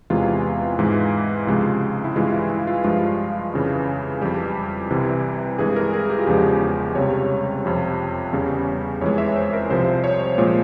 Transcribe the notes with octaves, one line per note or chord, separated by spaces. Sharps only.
E2 C3 E3 G#3 F4
G#2 E3 G#3
C#2 C3 F3 G#3
E4
G2 E3 G#3 F4
E4
E4
F4
G2 F3 G#3 F4
F2 C#3 E3
F2 E3 G3 G4
C2 C3 E3
G2 E3 G#3 G#4
A#4
G#4
G4
F4
E2 C#3 F3 G#3 G4
C#2 C3 G3 C#5
F2 C3 F3
E2 C#3 G3
F2 E3 G#3 C#5
E5
C5
A#4
C2 C3 F3 C5
C#5
A#2 F3 G#3 C5